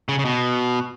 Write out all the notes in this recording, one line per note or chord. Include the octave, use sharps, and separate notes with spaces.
C#3
C#3
B2